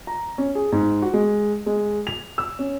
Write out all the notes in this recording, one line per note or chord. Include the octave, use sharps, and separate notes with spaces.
A#5
C#4
G#4
G#2
F#4
G#3
G#3
F7
E6
C#4